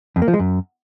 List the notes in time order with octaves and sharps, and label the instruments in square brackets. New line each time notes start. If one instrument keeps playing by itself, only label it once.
[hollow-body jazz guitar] F2
A#3
F3
G#3
F#2